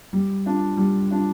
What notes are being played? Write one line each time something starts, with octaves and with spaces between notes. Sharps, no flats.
G3
D4 F4
G3
D4 F4